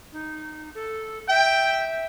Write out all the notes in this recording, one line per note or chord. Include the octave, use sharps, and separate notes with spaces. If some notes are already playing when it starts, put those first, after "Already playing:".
D#4
A4
E5 G5